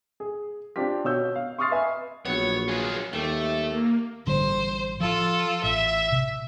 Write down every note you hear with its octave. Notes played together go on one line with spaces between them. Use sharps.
G#4
C4 D4 F4 G4 B6
B2 C#5 E6 G6
F5
C6 C#6 D#6 F6 A6 C7
B4 E5 G#5
A#1 F#3 B3 C#5
F4 G#4
D#2 G3 A3
A#3
A1 D3 G3 C5
F3 F4 A4
A1 E5
C3